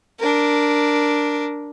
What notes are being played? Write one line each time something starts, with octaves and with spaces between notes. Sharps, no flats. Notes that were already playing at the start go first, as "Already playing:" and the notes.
D4 A#4